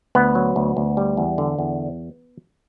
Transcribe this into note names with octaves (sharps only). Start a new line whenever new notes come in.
D2 B3
F#3
D2
D2
G3
E2
D3
E2